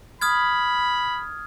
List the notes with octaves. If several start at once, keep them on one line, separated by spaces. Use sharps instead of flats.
B5 D#6 F6 G#6